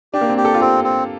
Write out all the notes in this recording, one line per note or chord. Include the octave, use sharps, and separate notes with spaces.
D4 G4
A#3
C4
G4
A4
F4
C4 G4
C4